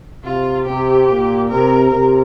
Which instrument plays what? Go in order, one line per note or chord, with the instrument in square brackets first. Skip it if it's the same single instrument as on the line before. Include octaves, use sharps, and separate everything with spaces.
[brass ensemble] C3 [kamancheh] F4
[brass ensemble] C3 [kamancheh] G4
[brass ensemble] A#2
[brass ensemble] C3 [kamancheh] A#4
[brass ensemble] C3 [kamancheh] A#4